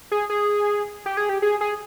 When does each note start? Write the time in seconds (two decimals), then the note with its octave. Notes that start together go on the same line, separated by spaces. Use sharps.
0.12 G#4
0.30 G#4
1.06 G4
1.17 G#4
1.29 G4
1.42 G#4
1.61 G#4